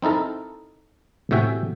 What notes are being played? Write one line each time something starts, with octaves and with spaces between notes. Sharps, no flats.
C4 D#4 E4 A4 A#4
A2 C3 F#4 E5 G5 G#5